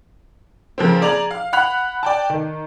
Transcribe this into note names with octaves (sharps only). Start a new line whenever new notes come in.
C#3 F3 A#3 C4
G#4 D5 A#5 F7 F#7
F5
F#5 B5 F#6 F7
D5 G5 A5
D#3